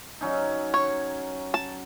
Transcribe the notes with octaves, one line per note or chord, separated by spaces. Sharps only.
F#3 C#4 D#4
C#5
A5